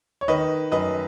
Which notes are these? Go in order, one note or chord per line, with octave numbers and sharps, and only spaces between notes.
C#5
D#3 B4 D#5
F#2 B4 D#5